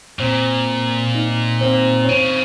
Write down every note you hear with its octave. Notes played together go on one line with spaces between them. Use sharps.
A#2 C4
D#4
C4
C#4
C#3 C4